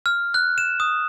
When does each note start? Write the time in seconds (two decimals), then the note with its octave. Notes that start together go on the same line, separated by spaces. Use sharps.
0.06 F6
0.34 F#6
0.58 E7
0.80 D#6